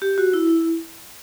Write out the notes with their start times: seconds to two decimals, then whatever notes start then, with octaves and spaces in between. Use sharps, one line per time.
0.02 G4
0.18 F#4
0.33 E4
0.49 E4